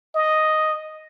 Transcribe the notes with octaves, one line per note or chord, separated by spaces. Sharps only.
D#5